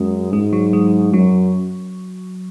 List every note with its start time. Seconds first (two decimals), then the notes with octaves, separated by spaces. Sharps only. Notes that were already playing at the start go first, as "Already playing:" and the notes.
Already playing: F#2 G#3
0.32 G#2 G#3
0.53 F#3
0.73 G#3
1.13 F#2 F#3